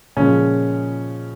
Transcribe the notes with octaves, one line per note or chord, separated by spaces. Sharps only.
A#2 C#3 F3 G#3 C#4